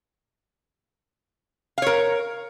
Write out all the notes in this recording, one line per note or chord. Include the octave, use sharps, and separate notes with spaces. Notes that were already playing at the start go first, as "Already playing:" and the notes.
A#4 C#5 F5